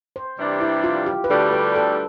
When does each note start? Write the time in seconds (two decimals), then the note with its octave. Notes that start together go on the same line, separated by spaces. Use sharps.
0.16 C5
0.38 C3 E3 G3 D4
0.61 E4
0.84 F4
1.06 G4
1.24 B4
1.30 D2 D3 G3 D4 G4 A4
1.52 B4
1.76 A4